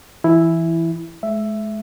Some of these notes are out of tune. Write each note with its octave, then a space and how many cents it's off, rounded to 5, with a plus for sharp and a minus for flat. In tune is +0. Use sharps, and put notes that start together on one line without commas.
E3 +10 E4 +0
G#3 +40 E5 +10